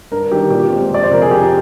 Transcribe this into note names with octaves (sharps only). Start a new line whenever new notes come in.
G2 A#4
D#3 G3 D4 G4
A#2 G4
G#3 C4
F2 D5
C5
C3 F3 A#4
G#4
F2 G4